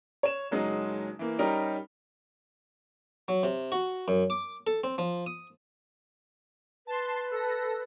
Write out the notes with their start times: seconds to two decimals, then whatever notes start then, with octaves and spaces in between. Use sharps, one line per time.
0.23 C#5 E7
0.51 F#1 F#3 G#3 D#4 D#6
1.19 E3 A#3
1.39 G3 C#4 D#4 G4 A#4
3.28 F#3
3.43 C3
3.72 F#4
4.08 F#2
4.30 D6
4.67 A4
4.84 C4
4.98 F3
5.26 D#6
6.87 B4 A5 C6
7.31 A4 A#6